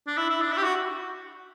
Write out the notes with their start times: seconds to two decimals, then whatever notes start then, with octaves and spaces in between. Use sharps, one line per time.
0.07 D4
0.18 E4
0.29 E4
0.41 D4
0.52 E4
0.57 G4
0.64 F#4